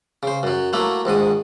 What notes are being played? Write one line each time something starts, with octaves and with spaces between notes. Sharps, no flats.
C#3 C5
F#2 F#3
F#3 A3 A#3 E4
A#1 G#2 D#3 D#6